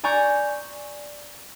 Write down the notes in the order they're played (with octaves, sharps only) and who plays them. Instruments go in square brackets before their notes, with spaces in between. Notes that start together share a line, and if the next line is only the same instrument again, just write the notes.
[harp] D5 G#5 A#5 C#6 G6